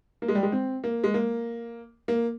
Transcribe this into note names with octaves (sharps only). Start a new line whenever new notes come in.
A#3
G#3
G3
G#3
C4
A#3
G#3
A#3
A#3